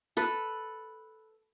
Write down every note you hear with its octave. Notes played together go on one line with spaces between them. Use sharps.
A4 B4